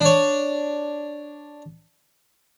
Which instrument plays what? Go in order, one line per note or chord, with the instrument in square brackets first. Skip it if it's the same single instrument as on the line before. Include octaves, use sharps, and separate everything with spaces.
[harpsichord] D4 C#5